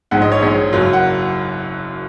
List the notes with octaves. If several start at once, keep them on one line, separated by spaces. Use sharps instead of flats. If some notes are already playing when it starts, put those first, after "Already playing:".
A#1 G#2 G#3 F#5
D#5
C#5
A#1 G#2 G#3 C#5
F#1 F#2 F#3 A#3
F#5